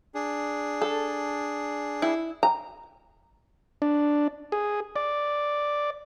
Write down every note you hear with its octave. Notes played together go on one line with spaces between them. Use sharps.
D4 G#4
A4
E4
A#5
D4
G#4
D5